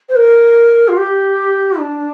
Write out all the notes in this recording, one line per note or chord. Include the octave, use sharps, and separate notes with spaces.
C5
A#4
F4
G4
D4